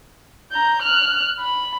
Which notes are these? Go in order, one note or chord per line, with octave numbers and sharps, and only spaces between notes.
A#5 G6
F6 F#6
B5